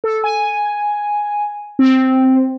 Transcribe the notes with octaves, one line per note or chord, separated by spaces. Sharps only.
A4
G#5
C4